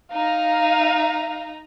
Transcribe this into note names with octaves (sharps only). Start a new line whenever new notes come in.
D#4 F5 A#5